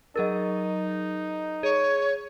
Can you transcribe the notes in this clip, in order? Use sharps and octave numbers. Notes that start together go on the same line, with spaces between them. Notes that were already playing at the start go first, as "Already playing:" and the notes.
F#3 D#4 G#4 A#4 D#5 A6
G#4 C#5